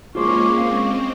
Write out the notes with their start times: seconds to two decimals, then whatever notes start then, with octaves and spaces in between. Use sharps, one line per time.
0.15 G#3 A#3 C#4 F4 G#4 C5 C#6 D6
0.58 G#3 C4 F5